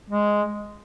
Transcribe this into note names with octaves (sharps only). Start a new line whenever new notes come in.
G#3